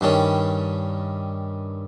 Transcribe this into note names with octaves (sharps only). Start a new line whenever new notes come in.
G2 D#3 G3 C#4